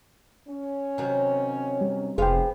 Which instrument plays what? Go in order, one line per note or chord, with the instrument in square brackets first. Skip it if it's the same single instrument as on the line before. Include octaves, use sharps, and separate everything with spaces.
[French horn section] C#4
[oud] C3 D#3 F#3
[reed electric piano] G3
[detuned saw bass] F1 [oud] B3 C5 F5 [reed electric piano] G#4 G5